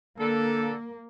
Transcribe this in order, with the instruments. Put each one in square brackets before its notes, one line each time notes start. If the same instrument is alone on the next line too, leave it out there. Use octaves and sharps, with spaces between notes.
[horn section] D3 A4 [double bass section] A#3